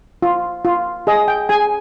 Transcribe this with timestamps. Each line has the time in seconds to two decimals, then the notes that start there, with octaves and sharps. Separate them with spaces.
0.22 F4
0.65 F4
1.07 G#4 D#5
1.28 G5
1.49 G#4 G#5